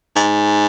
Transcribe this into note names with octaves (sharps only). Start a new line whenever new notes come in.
G#2